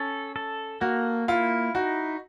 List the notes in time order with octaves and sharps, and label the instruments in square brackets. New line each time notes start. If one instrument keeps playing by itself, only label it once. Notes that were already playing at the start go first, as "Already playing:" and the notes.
Already playing: [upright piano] C#4 [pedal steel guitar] A4
[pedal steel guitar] A4
[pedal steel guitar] A#3 [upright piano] F#4
[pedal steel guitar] E4 [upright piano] F4
[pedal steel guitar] D#4 [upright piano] F#4